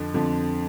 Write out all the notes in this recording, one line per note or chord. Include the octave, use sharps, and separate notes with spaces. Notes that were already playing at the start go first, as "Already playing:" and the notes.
Already playing: F2 D3 F3
F2 D3 F3